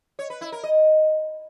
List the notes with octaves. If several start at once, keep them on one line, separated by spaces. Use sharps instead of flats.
C#5
B4
E4
A#4
D#5